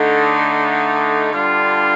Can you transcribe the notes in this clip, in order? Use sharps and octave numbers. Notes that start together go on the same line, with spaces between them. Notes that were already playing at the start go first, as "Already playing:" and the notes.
Already playing: D3 A3 D#4
D3 G3 D4 F4